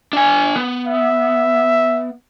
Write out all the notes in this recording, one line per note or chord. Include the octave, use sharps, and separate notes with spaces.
D4 G#5
B3
E5